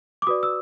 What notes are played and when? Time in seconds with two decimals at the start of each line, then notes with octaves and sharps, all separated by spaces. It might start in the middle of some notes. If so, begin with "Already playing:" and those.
0.22 D6
0.27 F#4 B4 D5 D#6
0.43 E6